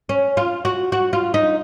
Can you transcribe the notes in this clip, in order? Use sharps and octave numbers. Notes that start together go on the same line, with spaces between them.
C#4
F4
F#4
F#4
F4
D#4